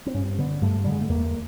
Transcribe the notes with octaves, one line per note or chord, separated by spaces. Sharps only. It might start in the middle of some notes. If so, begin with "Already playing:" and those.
C4
G2 C#4
D3 B3
G2 A3
D3 G3
G#3
A3
E2 A#3